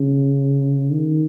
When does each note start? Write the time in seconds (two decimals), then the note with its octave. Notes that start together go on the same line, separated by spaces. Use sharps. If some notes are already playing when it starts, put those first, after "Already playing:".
Already playing: C#3
0.92 D#3